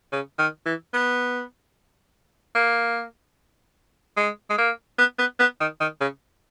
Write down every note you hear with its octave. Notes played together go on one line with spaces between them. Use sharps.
C#3
D#3
E3
B3
A#3
G#3
G#3
A#3
B3
B3
B3
D#3
D#3
C#3